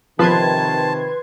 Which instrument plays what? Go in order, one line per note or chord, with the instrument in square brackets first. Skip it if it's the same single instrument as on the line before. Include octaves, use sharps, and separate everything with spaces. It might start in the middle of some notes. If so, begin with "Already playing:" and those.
[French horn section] C3 D#3 [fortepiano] F3 [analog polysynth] B4 C6 G#6 [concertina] A5